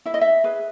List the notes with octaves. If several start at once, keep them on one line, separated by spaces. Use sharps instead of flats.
E4 E5
D#5
E5
G#4 B4